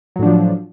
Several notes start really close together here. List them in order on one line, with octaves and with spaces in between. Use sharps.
F#3 A2 D4 F3